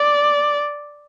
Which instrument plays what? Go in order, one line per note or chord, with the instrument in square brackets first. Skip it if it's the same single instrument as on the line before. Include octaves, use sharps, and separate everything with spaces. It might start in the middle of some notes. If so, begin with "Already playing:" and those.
Already playing: [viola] D5